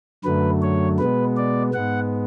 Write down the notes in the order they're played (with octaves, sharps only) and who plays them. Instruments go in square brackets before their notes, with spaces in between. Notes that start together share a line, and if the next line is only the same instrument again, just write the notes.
[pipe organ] F#2 D3 F#3 A3 B4
C#5
B2 G#3 B3 B4
D5
G#2 G#3 B3 F#5